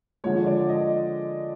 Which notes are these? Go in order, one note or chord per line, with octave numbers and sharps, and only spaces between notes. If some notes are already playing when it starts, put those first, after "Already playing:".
D3 F3 G#3 C#5
D5
D#5